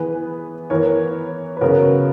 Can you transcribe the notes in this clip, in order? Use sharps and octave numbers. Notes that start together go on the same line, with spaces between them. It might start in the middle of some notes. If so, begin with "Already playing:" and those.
Already playing: E3 B3 G#4 B4
E3 B3 A#4 C#5
B4
C#3 F#3 B3 F#4 A#4